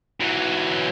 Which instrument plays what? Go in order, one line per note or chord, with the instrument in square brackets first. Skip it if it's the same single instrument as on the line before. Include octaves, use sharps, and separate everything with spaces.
[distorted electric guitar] E3 F#3